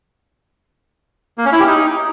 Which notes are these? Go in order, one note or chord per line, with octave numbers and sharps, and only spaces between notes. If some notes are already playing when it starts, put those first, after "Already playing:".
A#3
C#4
E4
G4
D#4